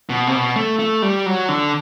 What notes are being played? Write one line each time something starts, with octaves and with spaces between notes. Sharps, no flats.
B2
C3
B2
A3
A3
G3
F#3
D3